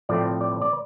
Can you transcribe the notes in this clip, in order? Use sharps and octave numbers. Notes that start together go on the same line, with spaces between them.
A2 F3 A3 C4 D5
D5
D5